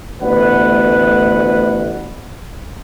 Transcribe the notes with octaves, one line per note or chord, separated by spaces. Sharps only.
A1 D2 B3 B4 F#5